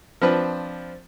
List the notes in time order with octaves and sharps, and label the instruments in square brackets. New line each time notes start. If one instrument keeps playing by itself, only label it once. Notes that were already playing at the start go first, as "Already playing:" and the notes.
[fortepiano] F3 C4 D4 B4